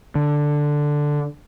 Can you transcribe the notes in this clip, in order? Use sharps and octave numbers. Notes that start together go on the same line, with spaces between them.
D3